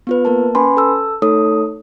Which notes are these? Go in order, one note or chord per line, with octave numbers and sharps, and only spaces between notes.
B3 F4 B4
A#3 A#4 A5
C#4 B4 G#5 B5 C6
A4 A5 E6
A3 D#4 A4 C#5 D#6